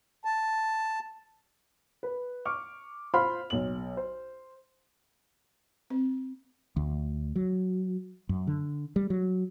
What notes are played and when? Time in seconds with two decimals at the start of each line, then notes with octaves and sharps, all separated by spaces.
0.25 A5
2.03 B4
2.45 C#6 D6 F6
3.14 F4 C5 F5 B5 C6 F6
3.50 B1 F#7
3.97 C5
5.90 C4
6.76 D2
7.36 F#3
8.29 F#2
8.47 D3
8.96 G3
9.10 F#3